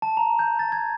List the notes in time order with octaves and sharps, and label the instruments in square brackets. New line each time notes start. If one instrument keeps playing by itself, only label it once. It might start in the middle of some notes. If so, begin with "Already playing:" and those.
[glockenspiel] A5
A#5
G6
A6
G#6